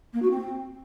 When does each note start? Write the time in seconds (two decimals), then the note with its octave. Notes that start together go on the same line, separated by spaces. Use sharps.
0.13 A#3
0.22 F#4
0.31 C4